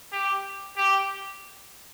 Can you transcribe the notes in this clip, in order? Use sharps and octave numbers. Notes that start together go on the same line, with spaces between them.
G4
G4